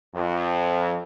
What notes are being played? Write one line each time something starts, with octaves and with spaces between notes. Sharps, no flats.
F2